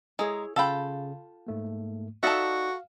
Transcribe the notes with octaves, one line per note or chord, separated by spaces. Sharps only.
G#3 E4 G#4 C#5 A#5
C#3 F4 A4 F5 G5 B5
G#2 A3 A#3
D#4 F#4 A4 D5 E5 F5